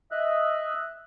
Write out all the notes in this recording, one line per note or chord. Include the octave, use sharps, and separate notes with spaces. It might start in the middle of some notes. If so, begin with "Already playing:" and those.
D#5 E5 F#6